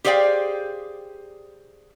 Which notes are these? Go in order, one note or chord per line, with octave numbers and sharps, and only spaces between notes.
G4 G#4 C5 D5 F5 G5